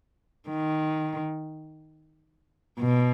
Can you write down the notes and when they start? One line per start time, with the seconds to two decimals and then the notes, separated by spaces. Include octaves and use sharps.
0.49 D#3
2.79 B2